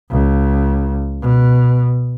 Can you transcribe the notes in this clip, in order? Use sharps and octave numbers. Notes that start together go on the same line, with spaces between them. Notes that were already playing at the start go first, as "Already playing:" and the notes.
C#2
B2